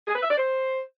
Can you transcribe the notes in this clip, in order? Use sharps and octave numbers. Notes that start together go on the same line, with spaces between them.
G#4
B4
E5
D5
C5